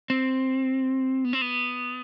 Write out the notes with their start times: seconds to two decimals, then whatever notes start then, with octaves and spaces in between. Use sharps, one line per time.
0.10 C4
1.25 B3
1.33 C4
1.42 B3